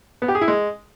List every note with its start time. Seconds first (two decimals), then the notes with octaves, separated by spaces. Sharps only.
0.22 B3
0.28 G4
0.35 G#4
0.41 E4
0.48 G#3